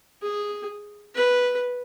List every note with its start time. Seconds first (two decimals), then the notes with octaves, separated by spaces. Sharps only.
0.23 G#4
1.15 B4